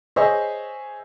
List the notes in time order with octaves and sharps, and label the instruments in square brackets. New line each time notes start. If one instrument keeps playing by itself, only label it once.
[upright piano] G#4 C5 C#5 D#5 E5